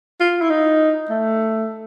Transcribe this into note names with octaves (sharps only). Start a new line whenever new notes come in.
F4
E4
D#4
A3